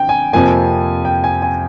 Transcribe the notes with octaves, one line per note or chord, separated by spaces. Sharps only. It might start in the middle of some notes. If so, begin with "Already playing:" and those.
Already playing: D3 G5
G#5
F2 C3 F3 A#3 G#5
G5
G#5
G#5